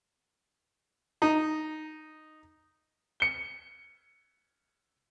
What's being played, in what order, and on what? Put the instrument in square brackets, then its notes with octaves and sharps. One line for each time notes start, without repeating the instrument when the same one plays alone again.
[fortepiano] D#4
[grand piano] C#7 G7